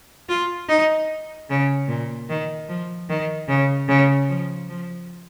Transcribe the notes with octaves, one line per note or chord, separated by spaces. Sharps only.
F4
D#4
C#3
A#2
D#3
F3
D#3
C#3
C#3
F3
F3